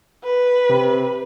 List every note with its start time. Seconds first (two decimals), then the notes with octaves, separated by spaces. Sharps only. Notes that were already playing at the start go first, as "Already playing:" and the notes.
0.24 B4
0.69 C3